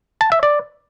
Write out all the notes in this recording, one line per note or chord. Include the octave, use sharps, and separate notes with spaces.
A5
E5
D5